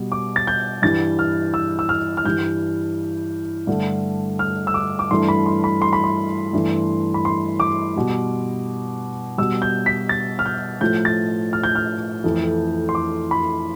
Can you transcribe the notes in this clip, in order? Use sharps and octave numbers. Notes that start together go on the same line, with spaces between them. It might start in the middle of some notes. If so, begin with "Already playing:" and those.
Already playing: B2 G3
D6
A6
G6
G2 E3 G3 A6
F6
E6
E6
F6
F6
G2 E3 G3 G6
G2 D3 A3
F6
E6
D6
D6
G2 E3 A3 C6
B5
C6
B5
C6
B5
C6
G2 E3 A3
B5
C6
D6
B2 G3
B2 G3 E6
G6
B6
A6
F6
G6
A2 F3 A3 G6
A6
F6
G6
F6
F2 E3 A3
C6
D6
B5